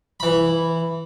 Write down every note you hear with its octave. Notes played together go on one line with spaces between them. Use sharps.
E3 B5